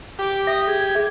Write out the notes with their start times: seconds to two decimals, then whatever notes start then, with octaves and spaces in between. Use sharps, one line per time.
0.19 G4 D6
0.47 E5 D#6 A#6
0.68 G#4 G#6
0.95 G#4 E5